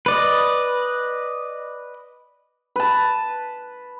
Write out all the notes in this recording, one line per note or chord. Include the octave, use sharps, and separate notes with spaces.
B4 D5 D#5
B4 A5